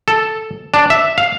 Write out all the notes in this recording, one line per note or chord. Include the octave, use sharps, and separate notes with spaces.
A4
D4
E5
F5